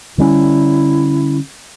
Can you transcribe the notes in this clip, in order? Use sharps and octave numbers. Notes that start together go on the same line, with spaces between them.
D3 G3 C#4 E4